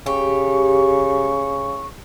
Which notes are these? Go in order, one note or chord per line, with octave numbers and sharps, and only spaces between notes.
C#3 G4 C#6